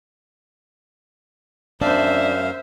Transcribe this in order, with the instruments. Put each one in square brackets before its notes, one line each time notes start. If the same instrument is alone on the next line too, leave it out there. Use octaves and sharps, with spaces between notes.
[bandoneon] F#2 F5 [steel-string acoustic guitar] C4 D4 D5 [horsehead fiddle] C5 E5